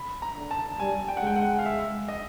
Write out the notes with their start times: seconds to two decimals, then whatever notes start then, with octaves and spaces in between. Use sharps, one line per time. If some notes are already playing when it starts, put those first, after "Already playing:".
Already playing: B5
0.22 A#5
0.36 D3
0.51 A5
0.79 G3 G#5
1.08 G5
1.17 F#5
1.22 G#3 G5
1.36 F#5
1.59 F5
1.65 E5
2.08 D#5